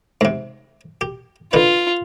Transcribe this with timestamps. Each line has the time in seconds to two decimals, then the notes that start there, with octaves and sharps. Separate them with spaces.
0.21 G#2 C3
1.01 G4
1.53 D3 D#4 F4 B4